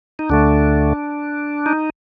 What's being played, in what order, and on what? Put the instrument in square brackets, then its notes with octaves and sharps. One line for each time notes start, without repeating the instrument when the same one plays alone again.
[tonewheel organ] D#4
D2 D3 A3 D4
D#4